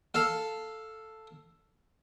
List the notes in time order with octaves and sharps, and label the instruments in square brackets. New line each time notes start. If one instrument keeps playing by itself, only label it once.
[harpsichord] A4 F5